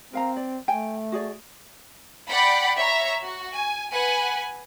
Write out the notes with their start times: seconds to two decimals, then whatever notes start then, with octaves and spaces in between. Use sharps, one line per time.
0.13 C4 A#4 F5 A#5
0.37 D5
0.68 A3 G5 G#5
1.12 F#4 G#4 D5
2.28 D5 F#5 G5 B5
2.78 C#5 E5 A#5
3.22 F#4
3.53 G#5
3.91 B4 F#5 G#5